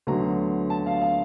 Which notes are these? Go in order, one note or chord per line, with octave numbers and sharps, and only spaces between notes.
D2 D3 F#3 B3 A#5
A5
F5
F5